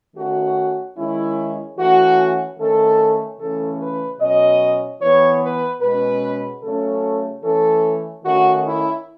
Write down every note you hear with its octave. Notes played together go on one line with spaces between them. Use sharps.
D#3 A3 C#4 F#4
D#3 G#3 C#4 E4
E3 A3 C#4 F#4
D#3 A3 C#4 A4
C#3 E3 A3 C#4 A4
B4
B2 F#3 C#4 D#5
E3 B3 C#5
B4
B2 G#3 C#4 B4
C#3 F#3 A3 C#4 A4
E3 A3 C#4 A4
D#3 A3 C#4 F#4
E4